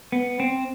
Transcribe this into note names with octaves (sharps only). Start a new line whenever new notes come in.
B3
C4